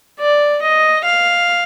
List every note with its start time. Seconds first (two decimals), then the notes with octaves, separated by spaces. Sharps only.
0.19 D5
0.62 D#5
1.04 F5